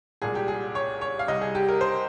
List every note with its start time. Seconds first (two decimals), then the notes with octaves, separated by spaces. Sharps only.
0.22 C2 A#2 G#3 G#4
0.35 G4
0.48 G#4
0.75 C#5
1.01 C#5
1.19 F5
1.28 C2 C3 G3 D#5
1.41 G#4
1.55 G4
1.68 A#4
1.81 C5